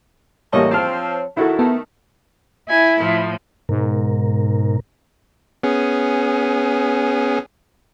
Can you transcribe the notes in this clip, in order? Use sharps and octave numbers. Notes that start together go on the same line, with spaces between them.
A1 F3 G3 A#3 F#4 C#5 D#5
F3 C4 A5 F6
D#3 F#3 E4 F#4 A4
D#3 A3 B3 A5
E4 G#5
A2 F3
G#2 B2 A#4
B3 C#4 G#4